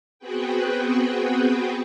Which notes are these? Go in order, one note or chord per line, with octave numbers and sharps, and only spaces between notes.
B3 C4 F#4 G#4 B4 G5